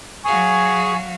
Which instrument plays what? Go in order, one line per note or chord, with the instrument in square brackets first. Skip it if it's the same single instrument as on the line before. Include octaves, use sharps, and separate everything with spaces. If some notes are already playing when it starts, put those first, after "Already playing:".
[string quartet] F#3 F#4 F5 [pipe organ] G#4 [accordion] G#5 C#6